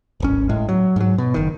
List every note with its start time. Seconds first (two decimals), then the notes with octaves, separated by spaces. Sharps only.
0.20 D1 G#1 C#4
0.49 A2 G#3
0.69 F#3
0.96 G#2 F#3
1.18 B2
1.34 F#1 D#3